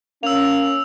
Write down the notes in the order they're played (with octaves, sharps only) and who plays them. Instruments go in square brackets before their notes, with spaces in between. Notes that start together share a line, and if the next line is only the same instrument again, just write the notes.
[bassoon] A#3 [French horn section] C#4 [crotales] E6 F7